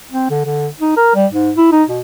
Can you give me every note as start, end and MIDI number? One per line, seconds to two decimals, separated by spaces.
0.12 0.29 60
0.30 0.44 50
0.45 0.67 50
0.80 0.94 63
0.96 1.12 70
1.15 1.26 55
1.32 1.51 44
1.57 1.67 64
1.72 1.83 63
1.89 2.00 47